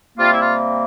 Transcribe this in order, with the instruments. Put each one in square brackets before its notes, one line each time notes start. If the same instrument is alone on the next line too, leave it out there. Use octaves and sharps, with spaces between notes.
[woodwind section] C3 G3 A#3 F4
E4
F4